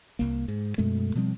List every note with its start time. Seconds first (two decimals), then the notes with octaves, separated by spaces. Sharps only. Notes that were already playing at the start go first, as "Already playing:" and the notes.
0.19 C2 A#3
0.48 G#2
0.78 F#2 B2 G#3 A3
1.15 B2 F3 G3 C4